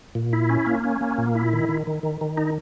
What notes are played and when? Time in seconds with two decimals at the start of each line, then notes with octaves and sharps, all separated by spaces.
0.15 A#2
0.33 E4
0.49 C#4
0.66 A#3
0.84 C#4
1.01 A#3
1.18 A#2
1.35 E4
1.53 D#3
1.69 D#3
1.87 D#3
2.03 D#3
2.21 D#3
2.37 D#4